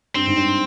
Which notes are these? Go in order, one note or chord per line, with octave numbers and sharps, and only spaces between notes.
G2 C4
G#2
G2